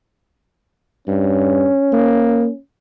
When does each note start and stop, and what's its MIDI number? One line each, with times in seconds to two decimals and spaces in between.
1.07 1.69 43
1.07 2.60 61
1.93 2.48 58